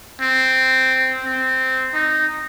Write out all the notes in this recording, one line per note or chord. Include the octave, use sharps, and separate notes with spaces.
C4
C4
D#4